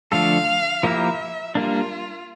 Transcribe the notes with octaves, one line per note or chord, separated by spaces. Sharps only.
D3 F3 A3 D4 A4 F5
F3 A#3 E4 G4 A#4 E5
G3 A#3 D4 F4